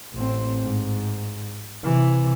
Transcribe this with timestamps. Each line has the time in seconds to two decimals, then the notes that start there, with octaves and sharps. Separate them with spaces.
0.14 A1 C4
0.63 G#2
1.84 C3 E3